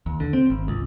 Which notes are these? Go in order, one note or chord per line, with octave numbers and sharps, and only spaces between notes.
D#2
D3
C4
G#1
C#2